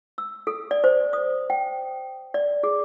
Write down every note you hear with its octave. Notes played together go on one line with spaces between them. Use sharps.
E6
A4
D5
C5
D#6
G5
D5
G#4